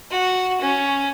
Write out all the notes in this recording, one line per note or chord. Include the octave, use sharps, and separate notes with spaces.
F#4
C#4